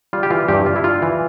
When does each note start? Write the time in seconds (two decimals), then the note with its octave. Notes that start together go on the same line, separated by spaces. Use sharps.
0.13 G3 F4
0.23 G4
0.30 E3 F4
0.48 G2 G4
0.66 G2 F4
0.76 E4
0.84 G3 F4
1.02 E3